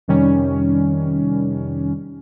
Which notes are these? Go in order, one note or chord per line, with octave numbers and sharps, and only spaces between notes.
F2 C3 D#3 G3 C#4